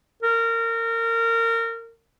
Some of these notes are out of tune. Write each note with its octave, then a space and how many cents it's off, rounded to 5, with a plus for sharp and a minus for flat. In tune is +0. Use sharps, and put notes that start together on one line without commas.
A#4 -25